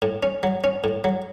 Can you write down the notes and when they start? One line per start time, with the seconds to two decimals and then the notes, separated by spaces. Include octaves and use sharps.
0.02 A2
0.23 C#4
0.43 F#3
0.64 C#4
0.84 A2
1.04 F#3